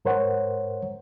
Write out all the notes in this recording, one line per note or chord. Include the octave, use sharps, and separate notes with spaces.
G#2 A#4 C5 C#5 F#5